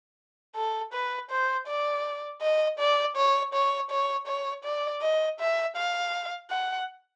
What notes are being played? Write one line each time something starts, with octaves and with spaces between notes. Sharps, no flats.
A4
B4
C5
D5
D#5
D5
C#5
C#5
C#5
C#5
D5
D#5
E5
F5
F#5